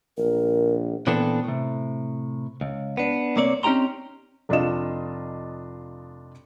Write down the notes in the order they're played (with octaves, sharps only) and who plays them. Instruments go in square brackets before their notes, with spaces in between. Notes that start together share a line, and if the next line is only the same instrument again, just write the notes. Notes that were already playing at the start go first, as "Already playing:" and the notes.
[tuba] A#1 [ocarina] A#4
[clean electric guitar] A#2 E3 B3 C4 D4 A4
A2 C3
C#2
B3 D4
C2 A#3 C4 C#5 D5
C4 C#4 D#4 G4 A#5 C6
[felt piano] F1 D4 F4 D#5 E7